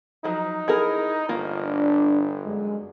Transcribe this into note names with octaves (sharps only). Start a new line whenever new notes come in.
F3 F#3 D#4
E4 G#4 A#4
G1 A#3 F4
D4
F#2 G#3